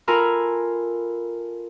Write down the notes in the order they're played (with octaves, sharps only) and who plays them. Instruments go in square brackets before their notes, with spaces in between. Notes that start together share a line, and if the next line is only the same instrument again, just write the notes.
[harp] F4 A4 A#4 G#5 A#5 B5